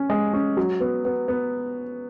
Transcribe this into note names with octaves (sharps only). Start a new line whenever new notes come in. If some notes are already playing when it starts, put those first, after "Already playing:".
Already playing: C#4
G#3
C#4
F#3
B3
B3
B3